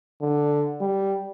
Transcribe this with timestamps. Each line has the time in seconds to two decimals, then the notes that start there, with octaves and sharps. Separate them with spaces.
0.22 D3
0.81 G3